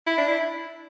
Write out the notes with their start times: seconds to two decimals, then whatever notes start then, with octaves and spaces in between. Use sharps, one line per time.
0.07 E4
0.18 D4
0.28 E4